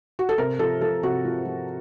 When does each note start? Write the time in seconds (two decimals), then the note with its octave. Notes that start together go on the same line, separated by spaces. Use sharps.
0.19 F#4
0.29 A4
0.38 C3 A#4
0.59 F3 A4
0.81 F3 A4
1.03 C3 F#4
1.24 F3
1.46 F3